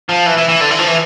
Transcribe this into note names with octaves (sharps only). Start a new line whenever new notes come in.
F3
E3
E3
E3
D3
E3
F3
E3